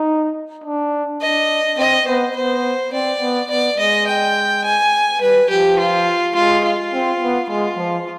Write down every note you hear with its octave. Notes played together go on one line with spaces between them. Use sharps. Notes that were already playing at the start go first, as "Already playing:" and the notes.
Already playing: D#4
D4
D4 D#5
C4 D#5
B3 C5
B3 C5
C4 D5
B3
B3 D5
G#3 D#5
G5
G#5
G3 B4
F3 G4
F4
G#3 F4
F4
C4
B3
G#3 F4
F3